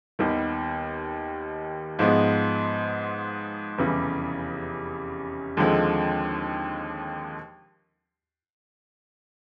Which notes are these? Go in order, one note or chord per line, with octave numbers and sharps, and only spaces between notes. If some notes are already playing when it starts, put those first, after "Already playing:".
D#2 D#3 G3 B3
G#2 F3 G#3 B3
F1 E2 C#3 E3 G3
D#2 D3 F3 G#3 C4